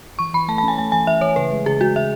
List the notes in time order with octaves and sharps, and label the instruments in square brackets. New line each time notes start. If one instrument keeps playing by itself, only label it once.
[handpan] E3 [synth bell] C#6
[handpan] E3 [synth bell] B5
[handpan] A3 [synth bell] A5
[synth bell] A5
[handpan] C#4 [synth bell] G#5
[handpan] A3 [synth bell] G#5
[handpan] E3 [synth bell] G#5
[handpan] E3 [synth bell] E5
[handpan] E3 [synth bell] C#5
[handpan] C#3 [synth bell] B4
[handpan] G#3
[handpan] C#3 [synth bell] G#4
[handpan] G#3 [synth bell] F#4
[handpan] C#3 [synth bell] E5